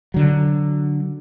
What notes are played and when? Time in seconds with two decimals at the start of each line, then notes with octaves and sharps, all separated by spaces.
0.14 D3 F#3